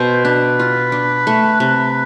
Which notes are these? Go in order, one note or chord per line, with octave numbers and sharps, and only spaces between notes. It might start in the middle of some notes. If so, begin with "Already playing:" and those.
Already playing: B2 C5
D4 B4
F4
D4
A3
C3 B4